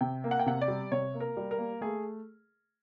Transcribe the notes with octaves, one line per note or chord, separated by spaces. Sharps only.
C3 G5
A#3
F#5
G5
C3 F#5
D5
G3
C3 C#5
A#3
A#4
G3
A#4
A#3
A3 G#4